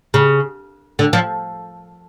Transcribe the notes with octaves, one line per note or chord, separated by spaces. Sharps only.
C#3
D3
F3